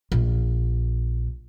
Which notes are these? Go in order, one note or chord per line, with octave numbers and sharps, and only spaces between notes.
A#1